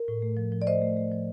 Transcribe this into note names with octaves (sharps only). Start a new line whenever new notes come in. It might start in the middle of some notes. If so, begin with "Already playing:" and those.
Already playing: A#4
A2
A3
F3
F3
D5
A3 C5 D#5
A3
A3
F3